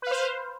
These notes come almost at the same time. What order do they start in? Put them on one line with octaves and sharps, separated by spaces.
B4 F5 C5